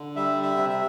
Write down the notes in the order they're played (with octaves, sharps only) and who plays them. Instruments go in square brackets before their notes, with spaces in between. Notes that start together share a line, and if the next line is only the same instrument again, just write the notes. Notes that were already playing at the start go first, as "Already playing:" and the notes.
Already playing: [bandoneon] D3
G3 E5
E5
C3
E5